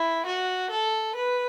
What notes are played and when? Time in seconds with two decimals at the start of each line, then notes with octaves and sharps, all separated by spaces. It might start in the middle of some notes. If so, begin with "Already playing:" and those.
Already playing: E4
0.26 F#4
0.70 A4
1.15 B4